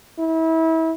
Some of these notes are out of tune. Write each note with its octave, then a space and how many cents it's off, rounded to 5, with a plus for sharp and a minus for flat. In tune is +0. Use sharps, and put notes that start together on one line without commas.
E4 -30